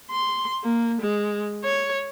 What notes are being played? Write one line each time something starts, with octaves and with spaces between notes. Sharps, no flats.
C6
A#3
G#3
C#5